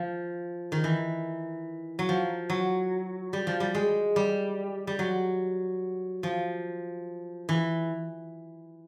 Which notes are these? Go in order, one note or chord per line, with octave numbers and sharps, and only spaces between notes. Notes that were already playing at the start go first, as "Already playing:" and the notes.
Already playing: F3
D#3
E3
F#3
F3
F#3
G3
F3
G3
G#3
G3
G3
F#3
F3
E3